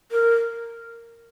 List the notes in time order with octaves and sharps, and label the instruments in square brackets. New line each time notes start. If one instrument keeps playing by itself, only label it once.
[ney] A#4